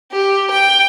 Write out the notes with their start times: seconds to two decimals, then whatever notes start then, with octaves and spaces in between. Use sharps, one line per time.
0.12 G4
0.51 G5